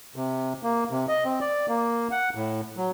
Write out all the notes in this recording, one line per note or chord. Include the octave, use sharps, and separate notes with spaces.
C3
A#3
C3
D#5
C4
D5
A#3
F#5
A2
F#3